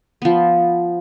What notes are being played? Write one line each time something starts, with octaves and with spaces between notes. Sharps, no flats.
F3 B3